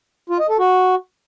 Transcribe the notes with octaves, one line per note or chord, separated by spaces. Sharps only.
F4
D#5
A4
F#4